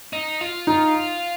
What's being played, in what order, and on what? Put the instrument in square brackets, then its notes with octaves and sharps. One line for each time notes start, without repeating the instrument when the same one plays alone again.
[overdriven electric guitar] D#4
F4
[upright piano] D#4